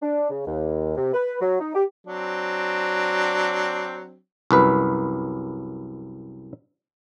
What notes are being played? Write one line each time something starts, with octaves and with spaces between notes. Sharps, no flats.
D4
C#3
D#2
C3
B4
F#3
D#4
G4
F#3 C4 D4
C2 F#2 B4